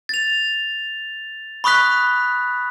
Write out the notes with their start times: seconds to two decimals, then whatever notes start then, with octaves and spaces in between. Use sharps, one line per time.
0.09 A6 F7
1.64 B5 C#6 D#6 F#6 B6